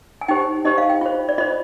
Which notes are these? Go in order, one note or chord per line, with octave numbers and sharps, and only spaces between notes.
G#5
D#4 G4 C5 G5
D#4 G4 C5 D#5
F5
G5
F4 C5
D5
F4 C5 D#5